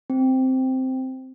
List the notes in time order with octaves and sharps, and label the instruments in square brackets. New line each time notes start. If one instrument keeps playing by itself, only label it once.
[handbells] C4